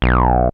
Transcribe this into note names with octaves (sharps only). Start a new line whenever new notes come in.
B1